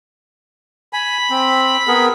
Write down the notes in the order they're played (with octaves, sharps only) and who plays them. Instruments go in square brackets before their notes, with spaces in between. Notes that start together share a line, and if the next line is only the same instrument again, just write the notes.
[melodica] G#5 [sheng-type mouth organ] B5
[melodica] C4
B3 G#4 A#4